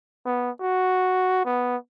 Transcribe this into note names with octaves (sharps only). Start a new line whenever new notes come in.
B3
F#4
B3